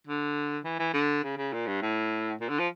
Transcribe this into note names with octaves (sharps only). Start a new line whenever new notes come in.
D3
E3
E3
D3
C#3
C#3
A#2
G2
A2
A#2
D3
F3